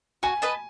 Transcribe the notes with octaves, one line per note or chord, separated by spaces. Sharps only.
F#4 G#5
B4 D#5 A5